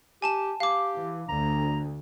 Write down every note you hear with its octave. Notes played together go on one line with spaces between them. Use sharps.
G4 G#5 A5 E7
G4 F5 D6
E3
D2 D3 A#5